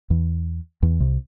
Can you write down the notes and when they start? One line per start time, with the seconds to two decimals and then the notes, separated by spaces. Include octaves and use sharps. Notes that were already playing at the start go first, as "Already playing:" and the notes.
0.10 E2 E3
0.83 E2 E3
1.00 C2 C3